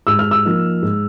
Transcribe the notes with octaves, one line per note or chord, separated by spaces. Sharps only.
G#2 E6
F6
E6
F3 A#3 D#4
G#2